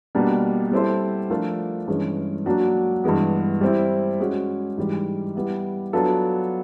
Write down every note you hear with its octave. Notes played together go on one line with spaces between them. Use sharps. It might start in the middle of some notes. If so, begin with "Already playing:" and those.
B2 G3 A#3 D4
G3 C4 E4 A4 C5
F3 A3 D4 F4 A#4
G2 E3 G#3 C#4
F#3 A#3 D4 F#4
G2 E3 G#3 B3
G3 C4 E4
G#3 C#4 F#4
G#2 E3 G3
G3 B3 E4
F#3 B3 D4 F4 A4